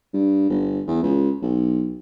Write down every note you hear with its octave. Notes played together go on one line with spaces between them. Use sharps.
G2
G1
E2
C#2
B1